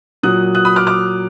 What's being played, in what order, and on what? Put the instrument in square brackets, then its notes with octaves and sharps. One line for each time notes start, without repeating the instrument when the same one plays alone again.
[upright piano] A#2 F#3 D#6 F#6
D#6 F#6
B5 D#6
D6 F6
D6 F6